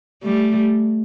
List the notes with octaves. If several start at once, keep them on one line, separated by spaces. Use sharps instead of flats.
G3 A3